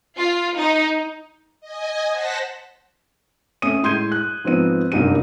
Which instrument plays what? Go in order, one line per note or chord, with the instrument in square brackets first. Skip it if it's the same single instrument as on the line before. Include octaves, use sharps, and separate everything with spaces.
[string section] F4
D#4
[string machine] D#5 G#5
C5 F#5 A5 A#6 B6
[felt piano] A3 C#4 E5 D#6 D#7
A2 G#3 C6 G6 G#6 D#7
F#6
G#2 F3 B3 C4 D#4 D#7
F#1 C2 G2 D#4 G4 D#7